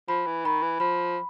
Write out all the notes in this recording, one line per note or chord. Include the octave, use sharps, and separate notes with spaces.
F3 B5
E3
D#3 B5
E3
F3 B5